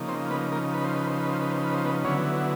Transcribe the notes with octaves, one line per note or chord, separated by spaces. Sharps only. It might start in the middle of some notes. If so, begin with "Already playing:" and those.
Already playing: C#3 F3 A#3 D#4
C4 C5
B3 B4
A#3 A#4
B4
C5
B4
C5
B4
C5
B4
C5
B4
C5
B3 B4
D3 F#3 B3 C#4 E4 C#5